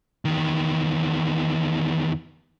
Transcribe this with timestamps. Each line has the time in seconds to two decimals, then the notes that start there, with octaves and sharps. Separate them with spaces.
0.25 E2 D#3